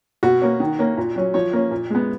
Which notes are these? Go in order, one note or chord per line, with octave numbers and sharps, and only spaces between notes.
B2 F#4
A#3 C#4
D#3
A#3 C#4
A#2
F#3 C#4
F3 C#5
A#3 C#4
A#2
G#3 B3